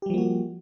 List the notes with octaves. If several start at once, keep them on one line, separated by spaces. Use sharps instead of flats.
F3 G3 A#3 F#4 G4